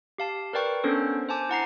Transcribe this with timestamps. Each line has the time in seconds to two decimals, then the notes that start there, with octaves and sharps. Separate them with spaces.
0.18 G4 F5 A5
0.53 A#4 B4 D5 G5 C#6
0.84 B3 C#4 D4 A4 A#4 C5
1.29 C5 G#5 A5 D6
1.49 E4 F#5 A#5 C7